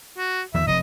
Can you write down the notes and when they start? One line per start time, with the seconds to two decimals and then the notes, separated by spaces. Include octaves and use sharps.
0.17 F#4
0.54 E2 D#3 F3 E5
0.67 F1 D#5